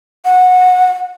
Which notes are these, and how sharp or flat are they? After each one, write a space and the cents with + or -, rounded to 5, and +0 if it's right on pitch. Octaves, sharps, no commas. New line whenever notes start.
F#5 -20